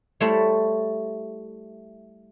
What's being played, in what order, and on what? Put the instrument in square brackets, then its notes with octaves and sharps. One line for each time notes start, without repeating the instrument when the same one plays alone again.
[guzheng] G3 A3 E4 C5 C#5 E5